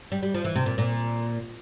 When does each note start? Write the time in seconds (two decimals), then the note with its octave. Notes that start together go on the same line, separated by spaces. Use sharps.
0.12 G3
0.23 G3
0.34 F3
0.45 E3
0.55 C3
0.66 A#2
0.78 A#2